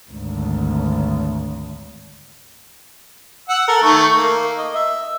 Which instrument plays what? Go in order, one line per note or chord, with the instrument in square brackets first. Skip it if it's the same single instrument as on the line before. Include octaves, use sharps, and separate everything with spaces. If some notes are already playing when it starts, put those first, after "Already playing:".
[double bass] G#1 D2
[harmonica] F#5 E6
A4 A#4
D#3 A3 C#6
A#3
D#5
E5